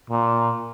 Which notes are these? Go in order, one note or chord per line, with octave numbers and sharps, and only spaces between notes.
A#2